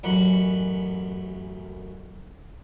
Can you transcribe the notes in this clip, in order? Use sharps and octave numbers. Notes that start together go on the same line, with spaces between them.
A1 F#2 F#5 B5